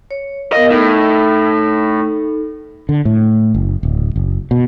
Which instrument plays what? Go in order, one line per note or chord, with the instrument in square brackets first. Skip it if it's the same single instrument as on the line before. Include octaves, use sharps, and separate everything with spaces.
[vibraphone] C#5
[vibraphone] B3 A#4 F5 [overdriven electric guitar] D#5
[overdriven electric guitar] A2 [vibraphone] D#4 A4
[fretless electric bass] D3
A2
F#1
D1
F#1
B2